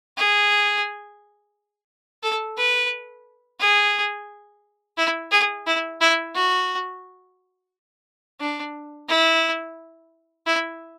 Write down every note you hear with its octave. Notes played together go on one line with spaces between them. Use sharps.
G#4
A4
B4
G#4
E4
G#4
E4
E4
F#4
D4
E4
E4